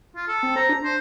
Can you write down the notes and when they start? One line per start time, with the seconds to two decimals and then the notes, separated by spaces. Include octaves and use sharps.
0.16 F4
0.28 A4
0.43 C4
0.56 C5 A#5
0.69 D4
0.84 C5